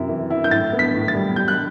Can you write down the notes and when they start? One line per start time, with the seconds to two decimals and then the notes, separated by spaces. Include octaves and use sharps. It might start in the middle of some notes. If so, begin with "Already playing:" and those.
Already playing: F#2 C3 E4
0.09 E3
0.30 E4
0.44 G6
0.51 A2 A6
0.73 B3
0.79 B6
0.94 A2
1.08 A6
1.15 G3
1.36 G3 G6
1.48 F#6